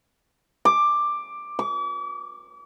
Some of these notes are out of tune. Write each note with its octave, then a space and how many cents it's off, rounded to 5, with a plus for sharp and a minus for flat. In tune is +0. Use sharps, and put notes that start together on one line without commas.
D6 +10
D6 -40